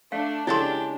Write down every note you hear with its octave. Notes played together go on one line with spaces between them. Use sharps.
A3 D4 F5
C#3 G#3 E4 G4 A4 C6